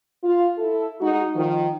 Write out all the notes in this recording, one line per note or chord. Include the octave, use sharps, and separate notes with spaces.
F4
E4 A4
G#3 D#4 F#4
D#3 F3